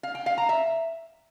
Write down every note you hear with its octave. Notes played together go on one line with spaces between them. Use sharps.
F5
G5
F5
A#5
E5